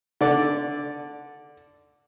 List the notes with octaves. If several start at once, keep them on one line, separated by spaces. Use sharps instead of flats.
D3 D5